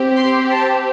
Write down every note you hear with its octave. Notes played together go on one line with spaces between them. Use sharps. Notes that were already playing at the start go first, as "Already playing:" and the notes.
Already playing: C4 G4
C6
A5